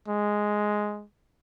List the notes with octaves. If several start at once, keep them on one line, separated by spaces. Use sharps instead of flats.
G#3